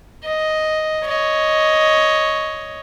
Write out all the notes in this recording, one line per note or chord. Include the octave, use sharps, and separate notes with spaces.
D#5
C#5 D#5